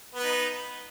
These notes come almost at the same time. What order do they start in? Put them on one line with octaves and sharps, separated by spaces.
B3 B4 D#4